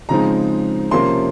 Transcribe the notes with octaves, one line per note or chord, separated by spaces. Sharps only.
C#3 F3 G#3 C4 D#4 A#5
C3 F3 A#3 C#4 C6